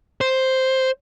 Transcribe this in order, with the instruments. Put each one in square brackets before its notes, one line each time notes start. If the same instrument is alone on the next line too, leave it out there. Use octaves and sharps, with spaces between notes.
[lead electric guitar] C5